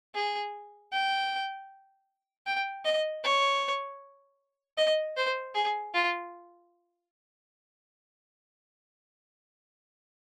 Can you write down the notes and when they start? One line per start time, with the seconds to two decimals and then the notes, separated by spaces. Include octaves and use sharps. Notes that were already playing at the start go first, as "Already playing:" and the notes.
0.14 G#4
0.92 G5
2.46 G5
2.85 D#5
3.24 C#5
4.77 D#5
5.16 C5
5.55 G#4
5.94 F4